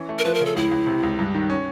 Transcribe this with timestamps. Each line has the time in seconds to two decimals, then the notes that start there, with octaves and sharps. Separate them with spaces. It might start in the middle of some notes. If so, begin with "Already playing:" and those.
Already playing: E3 C#4
0.09 A3
0.19 A#4
0.25 F3 B4
0.34 A#4
0.41 C#3 A4
0.56 C#2 E4
0.71 C#2
0.87 C3
1.03 C#2
1.19 G2
1.35 D#3
1.50 C#4